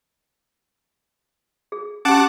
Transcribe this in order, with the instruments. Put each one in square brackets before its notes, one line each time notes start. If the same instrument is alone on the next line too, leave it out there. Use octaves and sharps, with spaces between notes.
[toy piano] G#4
[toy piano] C#4 G4 [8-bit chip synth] F#5 A5 D6